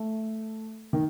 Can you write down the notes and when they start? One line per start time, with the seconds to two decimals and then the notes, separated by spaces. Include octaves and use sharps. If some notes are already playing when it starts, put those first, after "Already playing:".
Already playing: A3
0.93 D#3